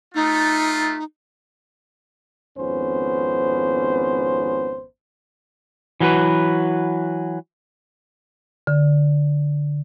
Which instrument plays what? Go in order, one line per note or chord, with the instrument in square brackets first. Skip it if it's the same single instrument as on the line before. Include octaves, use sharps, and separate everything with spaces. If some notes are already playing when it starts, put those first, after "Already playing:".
[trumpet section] A3 F4 [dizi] D#4
[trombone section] G#1 F2 B3 C#4 C5
[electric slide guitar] E3 F#3 F#4 A#4 B4
[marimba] D3